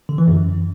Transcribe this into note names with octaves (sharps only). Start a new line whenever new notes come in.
D3
E3
F#2